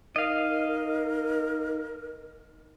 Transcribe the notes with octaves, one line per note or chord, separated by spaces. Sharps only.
D#4 A#4 D#5 F5